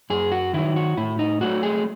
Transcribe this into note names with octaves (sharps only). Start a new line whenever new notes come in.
F#2 G#4
F#4
D#3 F#3 E4
F#4
A2 E4
D#4
F#3 A3 F#4
G#4